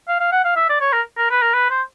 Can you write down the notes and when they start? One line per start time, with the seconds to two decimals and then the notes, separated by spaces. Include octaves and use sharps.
0.08 F5
0.20 F5
0.32 F#5
0.45 F5
0.56 E5
0.69 D5
0.81 C#5
0.93 A#4
1.18 A#4
1.30 B4
1.42 A#4
1.54 B4
1.70 C5